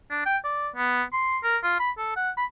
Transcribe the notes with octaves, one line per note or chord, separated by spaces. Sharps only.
D4
G5
D5
B3
C6
A#4
F4
B5
A4
F#5
B5